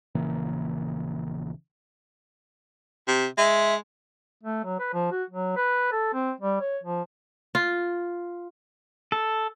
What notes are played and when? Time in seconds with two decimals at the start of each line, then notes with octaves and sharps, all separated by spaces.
0.15 A#1 C#3 E3 A#3
3.08 C3
3.37 G#3 E5
4.43 A3
4.65 F#3
4.80 B4
4.93 F3
5.11 F#4
5.30 F#3
5.56 B4
5.92 A4
6.13 C4
6.41 G3
6.60 C#5
6.83 F3
7.55 F4
9.12 A4